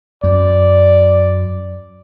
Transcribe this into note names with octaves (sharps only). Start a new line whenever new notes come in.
F#2 D5